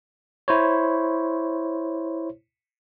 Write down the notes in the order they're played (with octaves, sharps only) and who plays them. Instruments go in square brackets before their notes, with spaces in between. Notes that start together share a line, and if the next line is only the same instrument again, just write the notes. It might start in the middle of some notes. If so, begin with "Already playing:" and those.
[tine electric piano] E4 C5 C#5